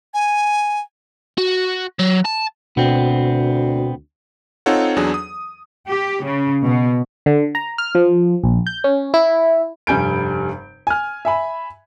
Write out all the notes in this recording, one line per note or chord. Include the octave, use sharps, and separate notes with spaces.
G#5
F#4
F#3
A5
D2 B2 B3 C4
C4 D#4 F4 A4 C#5 F#5
E2 F#3 D4 G#4
D#6
G4
C#3
B2
D3
A#5
F6
F3
A#1
G6
C#4
E4
F1 G2 G3 G#5 G6 D7
G#5 F6
E5 G#5 B5